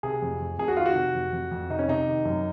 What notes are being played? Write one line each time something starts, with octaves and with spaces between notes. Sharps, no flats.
C3 G#4
F2
F2
F2 G#4
F#4
D#3 F4
F#4
C3
F2
F2
F2
C3 D#4
C#4
C3 D#4
D#3
F#2